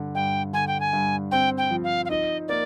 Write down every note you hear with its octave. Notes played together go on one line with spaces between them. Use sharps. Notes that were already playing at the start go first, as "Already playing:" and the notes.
Already playing: G2 D3
G2 G5
D3 G#5
G5
G#5
G2
C4 G5
G5
F3
F5
F5
D#4 D#5
A#3 D5